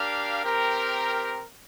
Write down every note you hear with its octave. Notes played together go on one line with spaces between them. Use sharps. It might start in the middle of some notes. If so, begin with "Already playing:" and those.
Already playing: D4 G4 A#4 F5
C4 G4 A#4